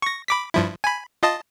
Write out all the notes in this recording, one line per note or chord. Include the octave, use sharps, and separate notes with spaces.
C#6 A#6
B5 D6 B6
G2 F3 E4
G#5 B5
F4 D#5 A5